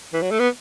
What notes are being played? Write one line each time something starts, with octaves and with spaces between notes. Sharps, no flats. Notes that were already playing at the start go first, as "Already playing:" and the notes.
E3
F#3
A3
B3